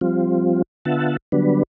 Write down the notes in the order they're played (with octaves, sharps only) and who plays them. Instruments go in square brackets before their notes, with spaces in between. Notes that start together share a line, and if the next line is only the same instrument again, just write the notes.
[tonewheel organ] F3 G3 C4 F4
D3 B3 F4 E5 F#5 A5
D3 F#3 G3 B3 D4 B4